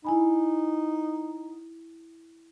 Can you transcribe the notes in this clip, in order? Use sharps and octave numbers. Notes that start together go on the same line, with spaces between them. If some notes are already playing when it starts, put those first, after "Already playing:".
D#4 E4 G#5 B5